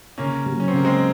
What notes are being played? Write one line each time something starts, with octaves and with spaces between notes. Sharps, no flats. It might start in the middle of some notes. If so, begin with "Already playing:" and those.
C#3 A#3 C#4
F#3
C#4
C4
C#3 A#3
G#3 C4